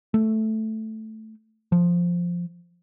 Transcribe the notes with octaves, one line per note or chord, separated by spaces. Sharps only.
A3
F3